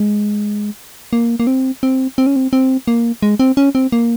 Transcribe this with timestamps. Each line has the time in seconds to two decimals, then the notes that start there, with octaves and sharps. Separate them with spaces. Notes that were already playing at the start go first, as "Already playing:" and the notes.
Already playing: G#3
1.13 A#3
1.40 A#3
1.47 C4
1.83 C4
2.18 C4
2.27 C#4
2.36 C4
2.53 C4
2.88 A#3
3.23 G#3
3.40 C4
3.57 C#4
3.75 C4
3.92 A#3